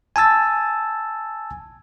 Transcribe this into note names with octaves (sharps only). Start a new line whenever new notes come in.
G#5 A5 E6 A6